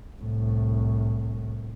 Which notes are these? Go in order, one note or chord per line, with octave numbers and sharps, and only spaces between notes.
C2 A2